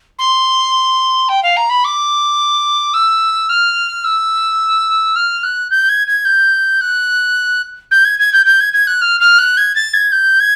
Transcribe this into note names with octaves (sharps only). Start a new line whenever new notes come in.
C6
G5
F5
A#5
B5
D6
E6
F6
E6
F6
F#6
G6
G#6
G#6
G6
F#6
G6
G#6
G#6
G6
G6
G#6
G#6
F#6
F6
F6
F#6
G#6
A6
G#6
G6
G#6